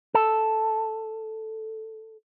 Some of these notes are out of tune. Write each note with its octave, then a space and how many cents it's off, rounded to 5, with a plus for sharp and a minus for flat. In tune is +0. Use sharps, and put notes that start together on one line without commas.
A4 +0